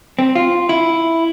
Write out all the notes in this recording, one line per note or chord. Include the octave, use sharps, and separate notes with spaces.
C4
F4
E4